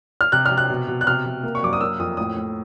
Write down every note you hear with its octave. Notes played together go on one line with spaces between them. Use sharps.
F6
C3 F#6
F6
C3
F#6
B2
B2
F#6
C3 F6
C3
A#3
C#6
F#2 D6
D#6
A#3 E6
F2 D#6
A2 D#6
A2